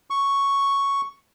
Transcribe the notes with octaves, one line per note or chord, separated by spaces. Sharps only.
C#6